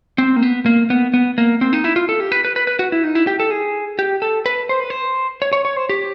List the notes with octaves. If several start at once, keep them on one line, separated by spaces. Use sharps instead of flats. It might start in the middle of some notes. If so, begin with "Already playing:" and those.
C4
A#3
B3
A#3
B3
B3
A#3
C4
D#4
E4
F4
A4
G4
B4
B4
B4
B4
F#4
E4
D#4
E4
G4
A4
G#4
G4
A4
B4
C5
B4
C5
C#5
C#5
C#5
C5
G4